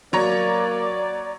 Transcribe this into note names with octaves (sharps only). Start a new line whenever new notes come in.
F#3 A#3 C#5 D5 A#5